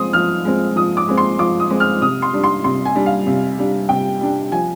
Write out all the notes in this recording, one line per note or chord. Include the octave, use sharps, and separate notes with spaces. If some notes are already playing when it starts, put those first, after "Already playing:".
Already playing: F3 G#3 C4 C6 D#6
F3 F6
G#3 C4
F3 D#6
D6
G#3 C4
C6
F3 D6
D#6
G#3 C4
F6
C3 D#6
C6
G3 D4
C6
C3 C6
G#5
G3 D4
F5
C3
G3 D4
C3 G5
G3 D4
F3 G#5